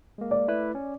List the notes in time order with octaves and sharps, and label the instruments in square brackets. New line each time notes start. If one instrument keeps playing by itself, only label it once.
[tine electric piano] G#3 A#3
[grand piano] D5
[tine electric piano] A3 E4 B4
C#4